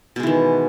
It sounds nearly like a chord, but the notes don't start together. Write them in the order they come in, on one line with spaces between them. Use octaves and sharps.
B2 G#3 E3 D#3